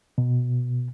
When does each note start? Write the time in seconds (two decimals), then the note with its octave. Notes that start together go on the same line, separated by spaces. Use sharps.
0.18 B2